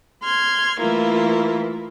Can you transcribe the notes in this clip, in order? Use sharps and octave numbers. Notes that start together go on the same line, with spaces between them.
C6 F6 G#6
E3 A3 A#3 E4 F4